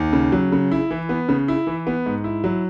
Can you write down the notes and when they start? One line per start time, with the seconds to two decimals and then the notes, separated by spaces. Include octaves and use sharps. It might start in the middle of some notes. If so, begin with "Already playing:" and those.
Already playing: D#2
0.13 C#3
0.32 F#3
0.52 C#3
0.71 E4
0.91 E3
1.09 B3
1.29 C#3
1.48 E4
1.67 E3
1.87 B3
2.06 G#2
2.24 E4
2.44 F#3